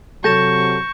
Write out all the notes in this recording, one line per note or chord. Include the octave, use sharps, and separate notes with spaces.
C3 F#3 A4 C#6 G6 A#6 E7